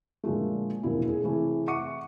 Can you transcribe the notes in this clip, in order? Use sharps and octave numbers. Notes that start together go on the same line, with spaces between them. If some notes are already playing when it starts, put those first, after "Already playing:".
A#2 D3 F3 G#3 A3
E1 F2 A#2 E4
G#4
C3 E3 A3 G#4
E5 F#5 C#6 D6 C#7 D#7